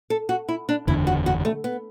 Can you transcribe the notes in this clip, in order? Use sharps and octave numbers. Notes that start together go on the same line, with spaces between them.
A4
F#4
E4
D4
F#1 E2 D3 E4
F#4
F#4
A3
B3